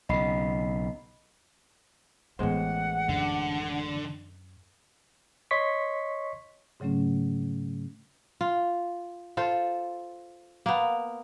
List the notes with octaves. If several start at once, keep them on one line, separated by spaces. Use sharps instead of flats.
B1 C#3 D#5 B5 C7
A1 G#3 B3 E4 C5 F#5
F#2 D3
C#5 D#5 C6 C#6 B6
G#2 C#3 F#3 A3 C#4
F4
F4 A4 C5
A#3 B3